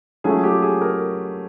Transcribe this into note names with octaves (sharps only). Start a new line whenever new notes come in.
F#3 A3 C#4 F4 G#4
G4
G#4
A#4